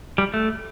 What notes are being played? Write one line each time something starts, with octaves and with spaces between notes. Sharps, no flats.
G3
A3